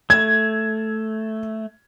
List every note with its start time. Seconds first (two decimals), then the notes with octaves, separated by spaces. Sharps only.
0.10 A3 G#6